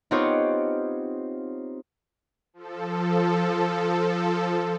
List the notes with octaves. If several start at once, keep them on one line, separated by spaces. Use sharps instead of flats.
B3 C4 D#4 F4 G4 C#5
F3 A4